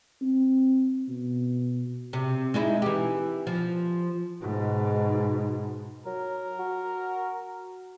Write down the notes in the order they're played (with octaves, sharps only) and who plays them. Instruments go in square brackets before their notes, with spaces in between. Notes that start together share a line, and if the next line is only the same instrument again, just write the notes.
[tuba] C4
B2
[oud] C3
G#3 D#4 E4
E3 G4
F3
[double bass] G#2 B2
[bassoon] F#3 [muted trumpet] A#4
[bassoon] F#4